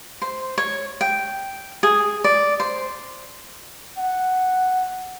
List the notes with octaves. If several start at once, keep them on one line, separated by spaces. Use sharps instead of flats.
C5
C#5
G5
G#4
D5
C5
F#5